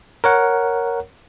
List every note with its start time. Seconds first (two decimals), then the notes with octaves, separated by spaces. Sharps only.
0.24 A#4 C#5 F#5